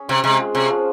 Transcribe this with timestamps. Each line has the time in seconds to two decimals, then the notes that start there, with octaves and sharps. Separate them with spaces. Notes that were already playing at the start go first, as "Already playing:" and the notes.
Already playing: C#4 G#4
0.09 C3 C4
0.24 C3 G#3
0.39 F4
0.55 C3 C#4
0.70 F3